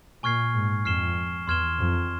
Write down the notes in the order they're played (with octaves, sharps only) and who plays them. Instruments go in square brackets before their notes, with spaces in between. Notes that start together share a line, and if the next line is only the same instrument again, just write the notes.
[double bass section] A#2 [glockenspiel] G#5 C#6 F6 G#6 C7
[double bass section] G#2
[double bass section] F2 [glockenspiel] F6 C7 E7 G7
[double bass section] E2 [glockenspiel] C6 F6 G#6 E7 G7
[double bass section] F2